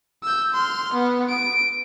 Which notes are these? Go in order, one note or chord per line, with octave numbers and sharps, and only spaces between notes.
E6 G6
C6 F6
B3
D7